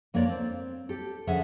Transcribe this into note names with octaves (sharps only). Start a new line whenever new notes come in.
F2 A#3 D4 C#5 D5
C4
G4 A4
F2 D3 C#4 G#4 E5 F#5